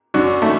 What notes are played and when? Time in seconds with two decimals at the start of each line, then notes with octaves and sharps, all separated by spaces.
0.14 F#2 D4 F#4
0.42 E3 A3 E4